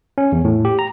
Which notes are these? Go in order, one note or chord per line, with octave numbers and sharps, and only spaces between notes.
C#4
E2
A2
G4
A#5